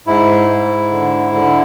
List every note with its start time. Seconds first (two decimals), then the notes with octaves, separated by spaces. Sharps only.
0.07 G#2 E4
0.49 G#2
0.91 D3
1.34 D3